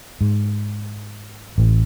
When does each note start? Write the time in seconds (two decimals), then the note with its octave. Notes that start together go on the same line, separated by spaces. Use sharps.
0.21 G#2
1.58 A1